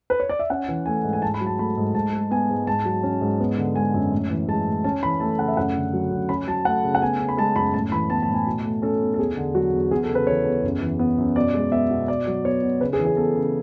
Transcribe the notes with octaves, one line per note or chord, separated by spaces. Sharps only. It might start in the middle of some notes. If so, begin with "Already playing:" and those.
B4
C#5
D5
E5
C#4 F#5
E3
A3 G#5
G#2
G#5
G#2 A5
B5
F#3
A5
A3 B5
G#2
G#2 A5
G#3
B3 G#5
G#2
G#2 A5
F#3
C#4
G#2
B3
D3
G#3 G#5
F#2
A2
E3
G#3 A5
A2
C#4 A5
E3 B5
A3 A5
C#3 F#5
E5
F#2 F#5
D3
F#3
F#2
C#4 B5
F#3 A5
A3 F#5
C#3
F#5
B3 G#5
C#3
B5
G#3 A5
F#2 B5
A2 A5
E3 B5
B3 A5
A5
A2
G#5
B2
A3
C#4 A4
B2
A4
E2 G#4
D3
F#3 F#4
E2
E2 G#4
A4
C#3
B4
E3 C#5
E2
F#2
E3
B3
F#2
B2 D5
G#3
B3 E5
B2
B2 D5
F#3
B3 C#5
B2
C#3 B4
G#4
E3
G#4
B3 A4
C#3